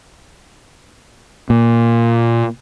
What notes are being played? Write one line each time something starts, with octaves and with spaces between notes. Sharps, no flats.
A#2